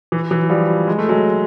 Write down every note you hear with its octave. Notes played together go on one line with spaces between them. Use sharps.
E3
E3 F#3
F3 G3
G#3
A3
F#3 G#3